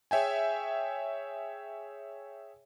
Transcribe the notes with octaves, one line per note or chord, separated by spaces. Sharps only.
G#4 C#5 E5 G5 G#5